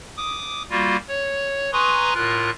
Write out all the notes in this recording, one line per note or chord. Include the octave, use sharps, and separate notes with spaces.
D6 D#6
G3 A#3 F4 F#4
C#5
B4 G#5 A#5 C6 C#6 D#6
A2 F4 A#4 F#6